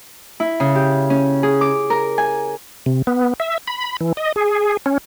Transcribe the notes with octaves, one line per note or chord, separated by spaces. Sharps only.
E4
C#3
G4
C#4
G#4
D6
A#4
G#5
C3
B3
E5
B5
E3
D#5
G#4
C#4